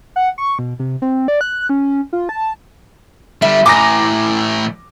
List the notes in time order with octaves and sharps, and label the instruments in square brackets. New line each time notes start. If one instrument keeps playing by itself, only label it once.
[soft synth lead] F#5
C#6
B2
C3
C4
D5
F#6
C#4
F4
A5
[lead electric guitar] D3 G3 [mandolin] E5
[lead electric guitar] A2 E3 [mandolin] G#5 A#5 D#6 [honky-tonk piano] D6 A#6